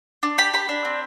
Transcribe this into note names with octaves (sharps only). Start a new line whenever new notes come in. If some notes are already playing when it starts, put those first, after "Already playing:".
D4
G4 B5
G4 B5
D4
C4